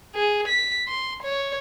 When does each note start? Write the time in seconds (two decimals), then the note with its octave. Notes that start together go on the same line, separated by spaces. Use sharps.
0.15 G#4
0.48 B6
0.88 C6
1.23 C#5